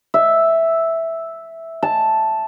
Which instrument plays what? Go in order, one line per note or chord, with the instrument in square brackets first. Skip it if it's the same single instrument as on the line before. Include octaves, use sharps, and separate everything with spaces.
[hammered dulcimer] E5
A5